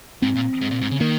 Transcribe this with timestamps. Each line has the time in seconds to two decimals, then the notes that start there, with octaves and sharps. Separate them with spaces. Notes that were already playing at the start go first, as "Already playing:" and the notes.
0.22 G#2 C4
0.36 A#2
0.61 G#2
0.71 A#2
0.81 G#2
0.91 C#3
1.00 D#3 A#3